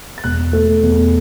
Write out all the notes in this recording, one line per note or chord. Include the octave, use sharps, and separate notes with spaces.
A6
E1 F#6
A3
E2